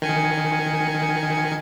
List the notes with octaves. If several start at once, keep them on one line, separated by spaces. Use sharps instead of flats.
D#3 G#5 C#7